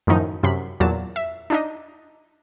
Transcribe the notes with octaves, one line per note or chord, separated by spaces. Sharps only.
F#2 A2 D#3 F3 D#4
F#2 C3 B5 B6
E2 A#2 F#3 A5
E5
D4 D#4 D#5